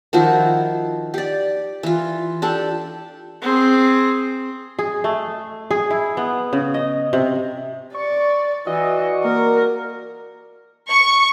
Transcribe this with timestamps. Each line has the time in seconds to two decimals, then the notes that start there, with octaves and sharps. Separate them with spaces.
0.13 D#3 F3 E4 F#4
1.14 G4 D5
1.83 E3 F4
2.42 D4 G4 A4
3.42 C4 G#4
4.79 G#4
5.04 A3
5.71 G#4
5.91 E4
6.17 B3
6.53 C#3
6.74 D#5
7.13 C3
7.94 D5 C#6
8.67 E3 F#4 D5 D#5 C#6
9.24 A#3 A#4
10.89 C#6